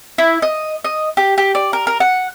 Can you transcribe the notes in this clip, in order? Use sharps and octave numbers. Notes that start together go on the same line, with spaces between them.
E4
D#5
D#5
G4
G4
D5
A#4
A#4
F#5